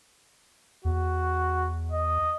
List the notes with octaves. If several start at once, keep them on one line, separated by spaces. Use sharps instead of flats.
E2 F#4
D#5